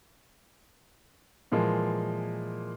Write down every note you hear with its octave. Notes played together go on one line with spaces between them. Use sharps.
A#2 E3 F3 G#3 A#3